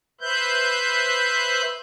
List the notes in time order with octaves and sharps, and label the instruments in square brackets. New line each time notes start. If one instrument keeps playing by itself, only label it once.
[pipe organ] B4 C5 E5 F#6 G6